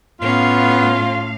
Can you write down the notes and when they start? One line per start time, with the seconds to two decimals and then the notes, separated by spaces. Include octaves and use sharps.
0.21 A2 B3 C#4 F4 F5